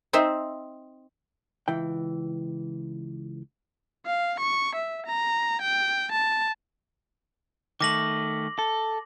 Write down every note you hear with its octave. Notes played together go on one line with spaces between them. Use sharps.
C4 D#4 C5 E5
C#2 E3 G5
F5
C#6
E5
A#5
G5
A5
D#3 A3 D6 A#6 F#7
A4